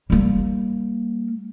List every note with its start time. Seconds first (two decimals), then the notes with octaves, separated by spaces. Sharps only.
0.10 G3 A#3